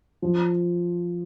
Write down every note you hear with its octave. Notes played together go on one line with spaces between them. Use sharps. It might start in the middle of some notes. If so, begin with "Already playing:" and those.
F3